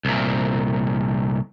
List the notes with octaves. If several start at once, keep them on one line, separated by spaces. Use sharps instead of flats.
C2 A#2